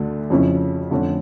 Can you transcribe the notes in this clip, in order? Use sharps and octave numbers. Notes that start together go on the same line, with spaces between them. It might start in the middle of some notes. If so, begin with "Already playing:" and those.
Already playing: D2 D3 A3 D4
F2 C#3 F3 C#4 E4
F2 D3 A3 C#4